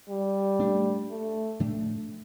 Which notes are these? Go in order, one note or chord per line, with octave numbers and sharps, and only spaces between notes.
G3
A2 A3 D4
A3
A2 F3 A3 D4